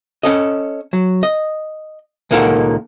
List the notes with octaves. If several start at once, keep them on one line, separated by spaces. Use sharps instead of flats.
C#4 A4 D#5
F#3
D#5
C#2 A#2 D#3 A#3 A4 F#5